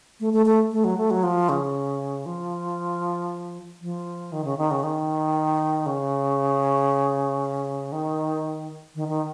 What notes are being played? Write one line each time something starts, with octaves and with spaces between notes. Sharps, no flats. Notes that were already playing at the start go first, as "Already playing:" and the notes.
A3
A3
A3
A3
F#3
A3
F#3
F3
C#3
F3
F3
D#3
C#3
D#3
C#3
D#3
C#3
D#3
D#3
D#3